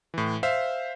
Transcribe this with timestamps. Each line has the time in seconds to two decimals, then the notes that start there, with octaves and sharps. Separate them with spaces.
0.14 A2 E3
0.43 C5 E5 F5